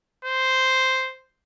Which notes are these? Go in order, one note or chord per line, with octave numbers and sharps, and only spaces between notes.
C5